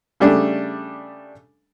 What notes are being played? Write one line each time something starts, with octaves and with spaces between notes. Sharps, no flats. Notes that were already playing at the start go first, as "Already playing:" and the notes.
C#3 G3 A3 D4